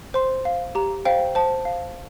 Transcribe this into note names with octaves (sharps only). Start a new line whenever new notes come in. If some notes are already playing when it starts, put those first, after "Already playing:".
C5 C6
F5
G4 A#5
C5 F5 G5
C5 A5
F5